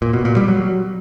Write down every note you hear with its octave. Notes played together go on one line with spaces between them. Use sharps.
A#2
B2
A#2
G3
F#3